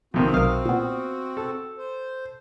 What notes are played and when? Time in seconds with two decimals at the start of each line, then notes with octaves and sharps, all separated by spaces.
0.14 A#1 F2 C3 D#3 C4 F#4
0.34 B1 A#4 F5 D#6
0.65 A#2 B3
1.37 A4
1.78 C5